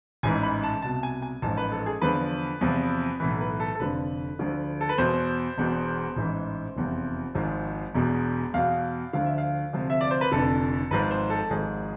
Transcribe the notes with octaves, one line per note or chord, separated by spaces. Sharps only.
A1 G#2 E3 G#5
B5
A5
C2 B2 A5
G#5
G#5
A1 G#2 F3 A5
B4
A4
G#4
E2 D3 F3 B4
E2 C3 F3
B1 A2 E3
B4
A4
A4
F1 F2 D3 F3 B4
D2 D3 F3
A4
B4
E2 B2 C5
E1 E2 B2
A1 G#2 E3
F1 E2 C3 F3
G#1 G#2 F3
E1 E2 B2
E2 B2 F5
D2 D3 F3 F5
E5
F5
D2 C3 F3
E5
D5
C5
B4
F1 F2 D3 A4
G#1 G#2 F3 B4
C5
A4
G#1 G#2 F3 G#4